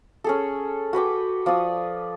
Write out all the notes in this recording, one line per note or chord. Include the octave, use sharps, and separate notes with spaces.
C#4 G#4 A4
F#4 B4 G5 D6
F3 D5 C#6 D#6